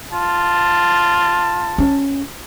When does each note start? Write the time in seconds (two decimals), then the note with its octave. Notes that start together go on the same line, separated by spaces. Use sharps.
0.13 F4 A5
1.78 C#4